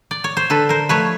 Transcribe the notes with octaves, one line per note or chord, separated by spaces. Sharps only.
D5
C#5
C5
D3 A4 B4
A#4 C5
F3 A3 B4 C#5